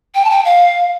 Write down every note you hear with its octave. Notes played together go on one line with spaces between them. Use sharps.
G5
A5
G5
F5